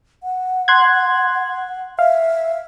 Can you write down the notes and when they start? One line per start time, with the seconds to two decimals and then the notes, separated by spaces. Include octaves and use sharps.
0.23 F#5
0.68 C6 F#6 G#6
1.99 E5 F5